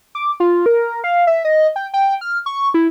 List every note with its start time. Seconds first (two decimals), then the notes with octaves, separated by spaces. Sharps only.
0.15 D6
0.40 F4
0.66 A#4
1.04 F5
1.27 E5
1.45 D#5
1.76 G5
1.94 G5
2.21 F6
2.46 C#6
2.74 E4